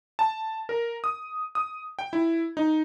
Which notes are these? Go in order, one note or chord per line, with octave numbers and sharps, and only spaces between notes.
A5
A#4
D#6
D#6
G5
E4
D#4